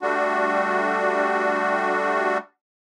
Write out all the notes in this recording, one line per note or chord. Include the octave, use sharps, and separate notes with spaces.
G3 A3 D4 F#4